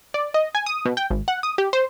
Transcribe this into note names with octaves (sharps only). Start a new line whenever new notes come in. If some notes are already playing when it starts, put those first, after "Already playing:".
D5
D#5
G#5
D#6
B2
G5
G#1
F#5
D#6
G4
C5